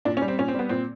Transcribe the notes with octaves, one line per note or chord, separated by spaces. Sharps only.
A#2 D4
C#4
G3
C4
A#2 C#4
C4
G3 B3
A#2 C4